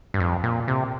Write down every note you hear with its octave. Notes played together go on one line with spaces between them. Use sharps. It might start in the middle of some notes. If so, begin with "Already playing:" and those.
G2
F2
A#2
C3